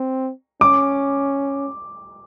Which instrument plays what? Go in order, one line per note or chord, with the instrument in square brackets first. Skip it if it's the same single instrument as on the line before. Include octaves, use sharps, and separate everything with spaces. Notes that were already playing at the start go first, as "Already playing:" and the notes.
Already playing: [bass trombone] C4
[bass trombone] C#4 [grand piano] D6